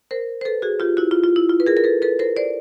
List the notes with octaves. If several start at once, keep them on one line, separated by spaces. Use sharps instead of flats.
A#4 C5
C5
A4 B4
F#4 G#4
F4 G4
E4 F#4
F4
F4
E4
F4
B4
G#4 A#4
A#4
A4 B4
A4 B4
A#4 C5
C5 D5